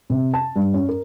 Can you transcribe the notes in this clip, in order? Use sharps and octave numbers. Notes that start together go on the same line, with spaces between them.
C3
A5
G2
C#4
A#4